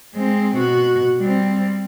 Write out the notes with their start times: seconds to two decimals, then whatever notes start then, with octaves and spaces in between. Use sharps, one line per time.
0.14 G#3 C4
0.57 B2 F#4
1.18 G3 C4